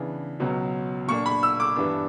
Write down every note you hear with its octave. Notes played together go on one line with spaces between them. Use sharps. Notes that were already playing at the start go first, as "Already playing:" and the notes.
Already playing: C#3 E3 B3 D4
C#2 B2 F#3 C#4
A#2 A#3 D4 C#6
B5
E6
D6
G2 E3 B3 D4